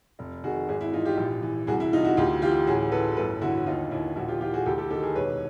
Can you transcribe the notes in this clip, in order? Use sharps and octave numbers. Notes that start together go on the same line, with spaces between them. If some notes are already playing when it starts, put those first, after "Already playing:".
F1
D#3 F#4 G#4
G#1 F#4 G#4
E4
E3 D#4 F4
F4 G4
A#1
E3
C2 F#4 G#4
E4
C2 D#4 F4
E4 F#4
D2 F4 G4
E3 F4 G4
A1 F#4 G#4
E3 A4 B4
G1 A4 B4
D3 E4 F#4
D#2 D#4 F4
D#2 E4
A#1 E4 F#4
F4 G4
E3 F4 G4
F#4 G#4
D2 G4 A4
G4 A4
D#3 G4 A4
G#4 A#4
E1 B4 C#5